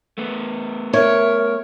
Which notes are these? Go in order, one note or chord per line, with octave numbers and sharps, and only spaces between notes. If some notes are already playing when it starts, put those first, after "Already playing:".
A3 B3
A#4 C#5 E5